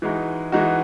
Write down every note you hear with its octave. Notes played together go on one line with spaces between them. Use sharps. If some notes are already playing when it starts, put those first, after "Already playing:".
E3 G#3 D#4 F#4
E3 G#3 D#4 F#4